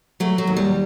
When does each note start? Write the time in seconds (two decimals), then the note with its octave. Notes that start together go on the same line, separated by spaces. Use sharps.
0.20 F#3 A3
0.38 F#3
0.47 D#2
0.57 G3